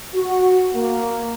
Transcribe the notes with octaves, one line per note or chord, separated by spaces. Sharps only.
F#4
A#3